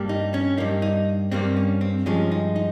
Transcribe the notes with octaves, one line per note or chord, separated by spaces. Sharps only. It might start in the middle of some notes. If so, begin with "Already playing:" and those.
Already playing: G2 G3 A#3
D#4
C#4
G2 G3 A#3 D#4
D#4
G2 G3 A#3 C4
C#4
C4
G2 F3 G#3 C#4
D#4
D#4